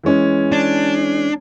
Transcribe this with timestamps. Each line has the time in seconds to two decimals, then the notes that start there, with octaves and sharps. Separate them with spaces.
0.04 E3 G#3 C#4
0.52 D4